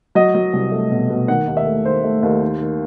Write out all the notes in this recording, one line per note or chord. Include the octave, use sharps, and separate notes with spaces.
F#3 D#5
F#3
C2
A3
B2
B2
D#3 F#5
D#2
E5
A3
D#2 C5
A3
D#2
D#3
D#3